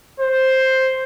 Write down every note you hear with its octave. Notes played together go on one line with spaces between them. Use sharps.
C5